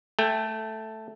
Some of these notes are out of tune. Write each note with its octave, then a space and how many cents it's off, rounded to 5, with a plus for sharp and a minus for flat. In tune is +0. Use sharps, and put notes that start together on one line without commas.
A3 +0 G5 +25